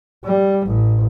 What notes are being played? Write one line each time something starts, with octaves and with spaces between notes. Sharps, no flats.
G3
A1